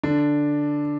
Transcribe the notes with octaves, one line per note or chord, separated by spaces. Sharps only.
D3 D4